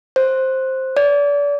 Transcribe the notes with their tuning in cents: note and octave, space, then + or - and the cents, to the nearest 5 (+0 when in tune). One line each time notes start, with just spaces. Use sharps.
C5 +5
D5 -35